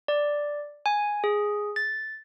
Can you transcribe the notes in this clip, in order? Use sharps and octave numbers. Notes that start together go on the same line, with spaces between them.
D5
G#5
G#4
A6